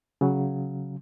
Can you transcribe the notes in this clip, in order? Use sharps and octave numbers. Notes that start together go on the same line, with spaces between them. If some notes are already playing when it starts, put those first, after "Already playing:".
C#3 F#3